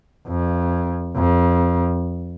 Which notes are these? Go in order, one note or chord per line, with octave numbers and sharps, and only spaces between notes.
F2
F2